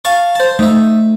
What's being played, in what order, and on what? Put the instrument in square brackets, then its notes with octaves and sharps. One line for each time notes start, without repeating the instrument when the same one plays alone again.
[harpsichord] F5 A5 C#6
C5 A5
[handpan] A3 [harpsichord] D#4 E5